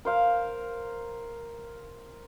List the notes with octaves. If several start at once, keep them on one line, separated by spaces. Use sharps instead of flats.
A#4 C5 F5